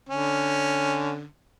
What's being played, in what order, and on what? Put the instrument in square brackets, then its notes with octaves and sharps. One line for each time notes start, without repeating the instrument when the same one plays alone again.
[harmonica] D3 C#4